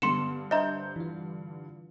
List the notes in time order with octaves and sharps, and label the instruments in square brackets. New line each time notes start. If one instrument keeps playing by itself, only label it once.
[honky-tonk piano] G2 D3 [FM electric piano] B3 [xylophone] C6 C#7 E7
[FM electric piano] D4 C5 G6 [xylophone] D#5 E5 A#5
[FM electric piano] E3 F4